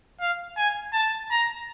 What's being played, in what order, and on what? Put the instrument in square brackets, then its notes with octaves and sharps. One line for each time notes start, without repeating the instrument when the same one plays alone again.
[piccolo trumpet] F5
G#5
A5
A#5